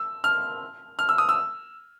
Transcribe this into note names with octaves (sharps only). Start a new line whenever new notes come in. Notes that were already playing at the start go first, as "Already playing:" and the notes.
Already playing: E6
F6
F6
E6
D#6
E6